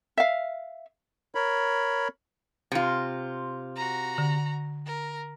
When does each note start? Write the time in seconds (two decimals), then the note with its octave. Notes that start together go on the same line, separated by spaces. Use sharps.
0.17 E5 F5
1.35 A#4 C#5 B5
2.72 C3 F4
3.76 F#4 A#5
4.18 D3
4.86 A#4